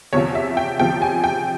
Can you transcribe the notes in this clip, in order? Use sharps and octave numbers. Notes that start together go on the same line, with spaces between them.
E2 C3 F3 C#5
E5
G5
E2 C3 F3 G5
G#5
G5